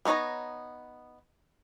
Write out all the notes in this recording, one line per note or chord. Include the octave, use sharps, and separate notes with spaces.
G3 B3 D#4 C#5 A#5